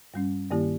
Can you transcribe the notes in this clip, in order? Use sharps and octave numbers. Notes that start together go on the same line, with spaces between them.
G2 G3 C#4
G2 D#3 A#3 E4 G4